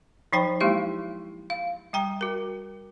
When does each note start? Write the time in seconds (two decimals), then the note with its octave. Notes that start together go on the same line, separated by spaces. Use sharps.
0.33 F3 F#3 D#4 C5 G5 A#5
0.60 G#3 A#3 E4 G4 F5 C6
1.50 F5
1.93 G3 G5 A#5
2.21 F#4 A#4